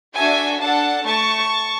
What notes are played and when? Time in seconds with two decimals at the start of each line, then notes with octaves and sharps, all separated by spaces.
0.15 D4 F#4 A4 E5 G#5
0.61 D4 A4 F#5 A5
1.05 A3 A5 C#6